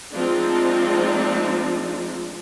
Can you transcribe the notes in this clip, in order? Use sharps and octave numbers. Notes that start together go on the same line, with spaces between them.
F3 G#3 A3 C4 D4 D#4